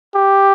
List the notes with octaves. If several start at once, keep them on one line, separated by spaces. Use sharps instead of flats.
G4